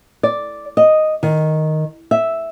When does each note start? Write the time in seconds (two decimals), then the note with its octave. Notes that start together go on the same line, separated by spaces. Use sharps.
0.23 D5
0.77 D#5
1.23 D#3
2.11 E5